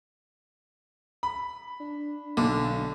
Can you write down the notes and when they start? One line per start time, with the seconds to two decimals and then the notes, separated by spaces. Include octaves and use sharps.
1.23 B5
1.80 D4
2.37 B1 D3